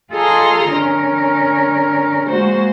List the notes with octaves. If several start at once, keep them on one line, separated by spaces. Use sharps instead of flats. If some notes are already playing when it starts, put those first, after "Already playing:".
F4 G#4 A4 D#5 A#5 C6
D3 C#4 A#4
G#3 A#3 F#4 C5